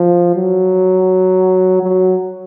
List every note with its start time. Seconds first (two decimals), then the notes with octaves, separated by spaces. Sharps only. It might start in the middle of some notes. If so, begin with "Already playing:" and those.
Already playing: F3
0.35 F#3
1.82 F#3